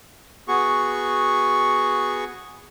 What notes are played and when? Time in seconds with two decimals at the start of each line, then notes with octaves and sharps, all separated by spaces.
0.48 B3 F#4 G#4 C#6